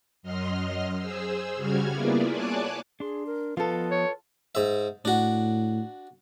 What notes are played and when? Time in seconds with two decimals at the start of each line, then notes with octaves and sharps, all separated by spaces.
0.23 F#2 F#3 D#5 C6 F6
0.98 G#4 C5 E6
1.56 C#3 G3 F#4 F6 G#6
1.90 A#3 B3 E4 F4 G#4 D5
2.31 C#5 D5 G#5 A5 D6 F#6
3.00 D4 G#4 C6
3.27 A#4
3.57 F3 B3 F4 A4 B4 D#5
3.91 C#5
4.55 G#2 E5
5.05 A2 D4 F#4